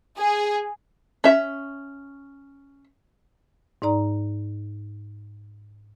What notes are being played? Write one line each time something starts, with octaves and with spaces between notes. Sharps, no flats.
G#4
C#4 E5
G#2 D#4 D5 A#5